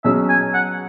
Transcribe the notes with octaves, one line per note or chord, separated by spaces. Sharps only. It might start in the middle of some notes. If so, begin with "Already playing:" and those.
B2 F#3 C#4 G#4 E5
G#5
F#5